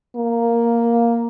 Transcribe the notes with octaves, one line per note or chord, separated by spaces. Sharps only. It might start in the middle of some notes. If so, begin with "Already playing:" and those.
A#3